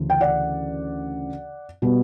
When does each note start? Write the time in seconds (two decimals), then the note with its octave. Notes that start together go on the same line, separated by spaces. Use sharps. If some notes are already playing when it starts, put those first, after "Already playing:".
Already playing: D2 C#3 E3
0.10 G5
0.21 D5 F#5
1.82 B2 G3 B3